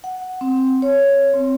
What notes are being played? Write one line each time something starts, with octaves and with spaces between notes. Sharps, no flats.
F#5
C4
C#5
C4